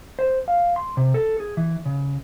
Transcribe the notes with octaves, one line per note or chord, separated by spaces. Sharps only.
C5
F5
C6
C3
A4
G#4
E3
C#3